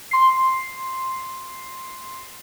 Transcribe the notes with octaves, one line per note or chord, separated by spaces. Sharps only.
C6 C7